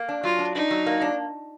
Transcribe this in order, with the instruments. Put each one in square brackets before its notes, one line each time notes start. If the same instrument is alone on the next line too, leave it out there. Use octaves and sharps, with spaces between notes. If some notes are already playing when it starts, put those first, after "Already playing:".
Already playing: [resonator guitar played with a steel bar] A#3
D4
[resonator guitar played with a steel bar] F#3 [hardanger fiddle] F4
[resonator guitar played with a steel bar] D4
[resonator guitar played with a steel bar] D4 [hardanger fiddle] D#4
[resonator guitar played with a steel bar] F#3
A#3
D4